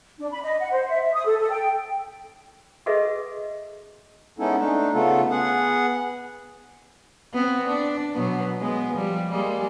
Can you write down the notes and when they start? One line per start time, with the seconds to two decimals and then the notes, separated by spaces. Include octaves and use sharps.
0.18 D4
0.31 B5
0.42 D#5
0.59 F#5
0.71 C5
0.89 E5
1.02 E5
1.14 D#6
1.26 A4
1.39 A4
1.51 G5
2.86 F#4 G#4 A4 B4 D#5 E5
4.39 G#3 B3 C#4 D#4 E4 A4
4.57 A3 D4 D#4
4.94 C#3 A3 B3 F4 A4
5.30 B3 G#4 F#5
7.34 B3 C4
7.67 D4
8.14 B2 F#3 B3
8.60 G#3 B3
8.92 F3 G3
9.30 G3 G#3 A#3